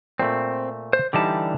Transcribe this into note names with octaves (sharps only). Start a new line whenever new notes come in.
A#2 A3 C4
C5
D3 E3 G3 D#4 G4 A5